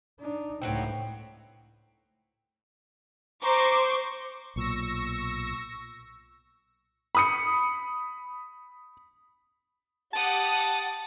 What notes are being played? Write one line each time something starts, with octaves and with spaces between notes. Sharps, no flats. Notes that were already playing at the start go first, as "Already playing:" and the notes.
D4 D#4
C#2 A2 F#3 B3 C4
C5 A#5 C#6 D6
B1 A#2 C#6 E6 A#6
B5 D#6 C#7
G4 F#5 A5 D#6